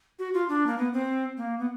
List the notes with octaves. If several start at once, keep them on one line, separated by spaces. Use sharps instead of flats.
F#4
F4
D4
A#3
B3
C4
A#3
B3